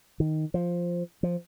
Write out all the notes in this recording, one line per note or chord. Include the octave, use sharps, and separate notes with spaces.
D#3
F3
F3